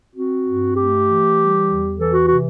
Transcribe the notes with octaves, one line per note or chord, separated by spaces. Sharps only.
C4 F#4
G2
A3 G4
E3
G3
E2
E3 A4
F#4
C3 F#4